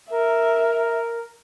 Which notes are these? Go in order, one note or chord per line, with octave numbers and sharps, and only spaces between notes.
A#4 E5